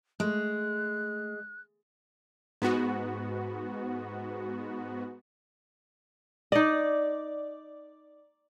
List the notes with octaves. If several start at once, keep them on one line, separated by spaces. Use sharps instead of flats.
G#3 A3 F#6
G#2 B3 F#4
D#4 D5 D#5